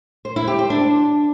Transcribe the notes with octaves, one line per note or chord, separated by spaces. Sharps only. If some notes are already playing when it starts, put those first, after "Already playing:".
C5
E4
G4
C5
D4